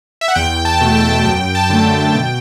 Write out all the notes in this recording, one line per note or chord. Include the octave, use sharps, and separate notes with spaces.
E5
F#5
E2 G5
A5
B2 A3
A5
F#2 G5
A5
D3 A3
A5
B2 G5